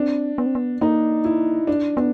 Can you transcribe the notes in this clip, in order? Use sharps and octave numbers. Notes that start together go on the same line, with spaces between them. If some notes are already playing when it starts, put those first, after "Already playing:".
Already playing: C4 D4
B3
C4
B3
A#3 D#4
E4
D4
B3 D4